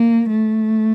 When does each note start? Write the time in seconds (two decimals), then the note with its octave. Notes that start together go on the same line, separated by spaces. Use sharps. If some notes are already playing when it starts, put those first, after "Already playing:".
Already playing: A#3
0.29 A3